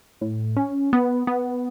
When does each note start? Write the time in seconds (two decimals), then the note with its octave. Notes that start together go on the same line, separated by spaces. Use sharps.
0.21 A2
0.57 C#4
0.93 B3
1.27 B3